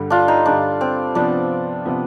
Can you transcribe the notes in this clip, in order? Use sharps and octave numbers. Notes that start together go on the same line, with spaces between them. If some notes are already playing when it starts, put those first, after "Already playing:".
Already playing: G2 D3 G3
D4 F4
D#4
G2 D3 G3 D4
C4
C3 F3 B3 D4
C3 F3 B3